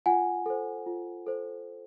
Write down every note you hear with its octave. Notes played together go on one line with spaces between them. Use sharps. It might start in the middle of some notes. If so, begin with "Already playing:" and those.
F4 F#5 G#5
A4 C5
F4
A4 C5